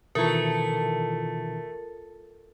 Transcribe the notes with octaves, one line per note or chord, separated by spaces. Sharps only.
B2 D#3 E3 A3 F4 A#4